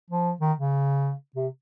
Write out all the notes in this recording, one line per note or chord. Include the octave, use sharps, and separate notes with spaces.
F3
D#3
C#3
C3